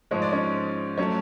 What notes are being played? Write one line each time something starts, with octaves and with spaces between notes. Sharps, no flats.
G#2 F3 G#3 C#5
D5
C#4 C#5
F#3 A3 C#4 C#5